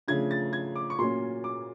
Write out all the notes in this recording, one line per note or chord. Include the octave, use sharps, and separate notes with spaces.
C#3 F3 A3 D4 G#6
A6
G#6
D6
C#6
A#2 F#3 A#3 C#4 C6
D6